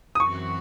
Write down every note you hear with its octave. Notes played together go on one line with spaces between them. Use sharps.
D#6
F#2 E3 C4 F#4 C#6